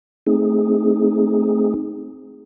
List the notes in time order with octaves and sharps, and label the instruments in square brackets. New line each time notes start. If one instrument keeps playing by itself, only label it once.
[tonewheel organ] A3 C4 D#4 G#4